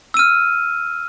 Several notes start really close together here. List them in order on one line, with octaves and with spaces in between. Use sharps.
E6 D#7 F6